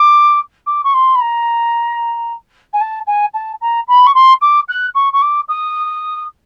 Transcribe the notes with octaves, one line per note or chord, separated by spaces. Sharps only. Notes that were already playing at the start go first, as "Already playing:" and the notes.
Already playing: D6
D6
C#6
C6
B5
A#5
G#5
A5
G#5
A5
A#5
B5
C#6
C6
D6
F#6
C#6
C#6
D6
D#6